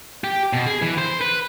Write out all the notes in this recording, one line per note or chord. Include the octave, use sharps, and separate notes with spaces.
G4
B2
G#4
E3
C5
B4